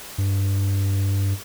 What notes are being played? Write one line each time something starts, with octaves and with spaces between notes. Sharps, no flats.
G2